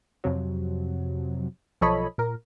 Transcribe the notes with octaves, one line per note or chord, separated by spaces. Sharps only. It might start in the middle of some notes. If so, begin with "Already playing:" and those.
F2 C3 F#3
B1 F3 A4 C#5 D#5 B5
A#2 A#4